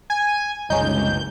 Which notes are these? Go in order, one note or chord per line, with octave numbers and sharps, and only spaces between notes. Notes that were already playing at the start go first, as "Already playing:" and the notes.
G#5
F#1 C2 G#3 C#4 D#4 G6